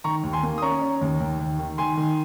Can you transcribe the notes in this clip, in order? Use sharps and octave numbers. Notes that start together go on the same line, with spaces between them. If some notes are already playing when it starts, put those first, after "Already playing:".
D#3 A#5 C#6
D#2
G#5 C6
A#3
D#6
C#4 A#5 C#6
C#4
D#2
D#2
D#2
D#3
D#3 G#5 C6
D#3